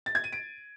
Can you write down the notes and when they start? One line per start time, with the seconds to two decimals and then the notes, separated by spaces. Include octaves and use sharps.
0.06 A6
0.15 G#6
0.24 D#7
0.32 D7